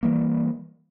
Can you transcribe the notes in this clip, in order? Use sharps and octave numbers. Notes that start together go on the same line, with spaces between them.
E3 G3 A#3